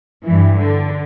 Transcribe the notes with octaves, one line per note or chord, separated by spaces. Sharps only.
G2 E3
D3